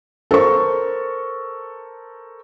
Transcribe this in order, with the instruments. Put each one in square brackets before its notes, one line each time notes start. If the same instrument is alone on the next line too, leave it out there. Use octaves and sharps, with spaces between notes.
[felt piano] A4 A#4 C5 C#6